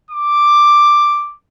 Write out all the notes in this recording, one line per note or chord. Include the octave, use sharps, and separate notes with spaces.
D6